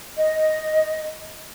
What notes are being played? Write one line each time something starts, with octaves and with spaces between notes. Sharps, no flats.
D#5